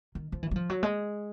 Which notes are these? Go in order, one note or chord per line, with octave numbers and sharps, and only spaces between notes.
D#3
F3
E3
F#3
F3
F#3
G#3